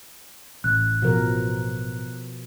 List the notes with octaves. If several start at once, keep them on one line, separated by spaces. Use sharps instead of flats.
A1 F#6
B2 F3 A#4